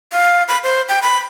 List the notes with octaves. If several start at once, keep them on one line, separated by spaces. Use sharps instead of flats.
F5
B5
C5
G5
B5